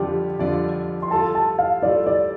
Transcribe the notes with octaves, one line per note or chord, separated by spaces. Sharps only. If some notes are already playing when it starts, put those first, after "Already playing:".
Already playing: F2 D3 G3 F4 G4 D5
F2 D3 G3 F4 D5
C6
G3 F4 A4 A5
A5
F5
G3 F4 A4 D5
D5